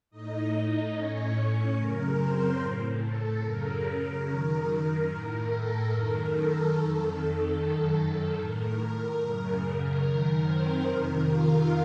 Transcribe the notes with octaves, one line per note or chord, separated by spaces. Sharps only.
A2 D#4 D#5
A2 C#4 C#5
F#2 C#3 A#4
C4 C5
A2
A4
F#2 C#3 A#4
F#2 D#3
A2 A#4
A4
F#2 D#3 A#4
A4
F2 D#3
F#2 D#3
A2 A#4
F#2 C#3
F#2 D#3 A#4
C4 C5
F2 C3 D#3 A#4
F4 F5